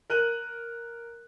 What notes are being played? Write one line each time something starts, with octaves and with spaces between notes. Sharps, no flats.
A#4 F#6 D#7 F#7